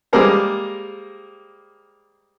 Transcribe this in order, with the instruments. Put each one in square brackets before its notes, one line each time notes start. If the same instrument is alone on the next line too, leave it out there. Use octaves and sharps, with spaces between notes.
[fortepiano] G3 G#3 A#3 G#4 A#4 C5